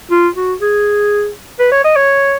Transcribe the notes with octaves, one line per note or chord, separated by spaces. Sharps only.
F4
F#4
G#4
B4
C#5
D#5
C#5